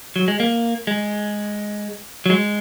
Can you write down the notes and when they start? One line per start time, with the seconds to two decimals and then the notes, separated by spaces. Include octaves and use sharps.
0.16 F#3
0.28 G#3
0.40 A#3
0.87 G#3
2.26 F#3
2.30 G#3